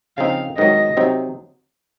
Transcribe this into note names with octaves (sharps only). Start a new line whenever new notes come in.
C#3 F3 C4 D#4 F5
G#2 D#3 F#3 D#5
C3 F#3 C4 D#4